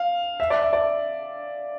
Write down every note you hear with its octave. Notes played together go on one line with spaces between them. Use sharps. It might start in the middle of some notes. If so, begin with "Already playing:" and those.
Already playing: F5
E5
D5
E5
D5